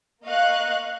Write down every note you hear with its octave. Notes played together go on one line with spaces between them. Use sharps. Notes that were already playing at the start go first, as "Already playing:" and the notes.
A#3 D#5 F5 C#6 F#6